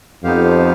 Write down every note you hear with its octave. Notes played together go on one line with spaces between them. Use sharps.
F2 B3 D#4 G4 C5 F5